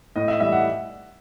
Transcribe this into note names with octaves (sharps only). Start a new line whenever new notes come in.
A2 D#5
E5
E3 G3 E5
F#5